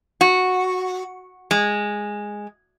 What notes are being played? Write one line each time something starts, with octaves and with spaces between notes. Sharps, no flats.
F#4
G#3